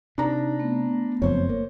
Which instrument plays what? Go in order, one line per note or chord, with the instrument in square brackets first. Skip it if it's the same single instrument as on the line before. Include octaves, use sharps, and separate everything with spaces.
[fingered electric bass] C3 [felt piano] D4 A#5 [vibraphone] D#4
[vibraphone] A3 B3
[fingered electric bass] F#1 F2 [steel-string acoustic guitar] C5 C#5
[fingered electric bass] A#3